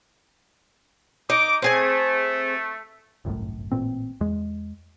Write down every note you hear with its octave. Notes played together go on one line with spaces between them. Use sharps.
D#4 D6
A3 C4 G#4 G#5
G1 C2 F#2 A2
A1 A#2 C4
E2 G#3